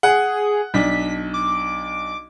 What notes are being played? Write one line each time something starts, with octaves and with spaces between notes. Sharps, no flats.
G#4 F#5
B1 D4 B6
D6